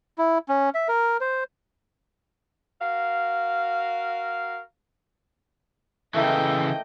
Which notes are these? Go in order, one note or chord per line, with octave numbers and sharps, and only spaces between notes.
E4
C#4
E5
A#4
C5
F#4 A#4 F5
C#3 E3 A3 A#3 E4 D#5 G5